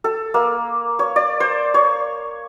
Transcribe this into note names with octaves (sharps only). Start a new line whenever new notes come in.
A4
A#3
C#5
D5
C5
C#5